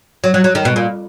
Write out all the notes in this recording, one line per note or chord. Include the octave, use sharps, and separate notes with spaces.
F#3
F#3
F#3
D#3
B2
A#2